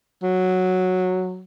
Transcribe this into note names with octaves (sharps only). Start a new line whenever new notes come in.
F#3